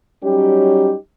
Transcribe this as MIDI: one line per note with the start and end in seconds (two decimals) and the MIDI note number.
0.24 0.95 54
0.24 0.95 55
0.24 0.95 61
0.24 0.95 63
0.24 0.95 67